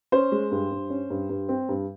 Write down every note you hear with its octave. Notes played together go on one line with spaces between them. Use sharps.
C#4 C5
G#3
G2
G2
C#4
G2
G2
C4
G2